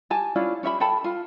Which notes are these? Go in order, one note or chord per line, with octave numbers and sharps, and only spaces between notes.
G4 G#5 A5
C#4 D4 E4 F4
C#4 G4 E5 B5
A4 G5 A5 B5
F4